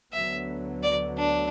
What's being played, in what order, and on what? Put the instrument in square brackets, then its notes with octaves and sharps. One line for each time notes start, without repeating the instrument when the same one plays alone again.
[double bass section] D2 D3 F#3 B3 [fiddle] E5
[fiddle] D5
D4